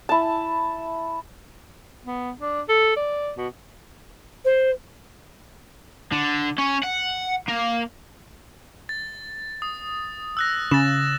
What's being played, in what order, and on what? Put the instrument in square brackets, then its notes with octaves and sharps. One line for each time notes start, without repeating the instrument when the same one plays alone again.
[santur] E4 A5
[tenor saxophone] B3
D4
A4
D5
B2
[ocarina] C5
[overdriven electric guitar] D3
C#4
F#5
A#3
[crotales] A6
D#6
E6 F#6 A#6
[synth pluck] C#3 [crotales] A6 E7